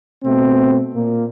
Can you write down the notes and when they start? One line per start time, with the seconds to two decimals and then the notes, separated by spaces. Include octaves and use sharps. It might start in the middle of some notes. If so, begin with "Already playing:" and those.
0.24 B2 A3 C4
0.95 A#2 A#3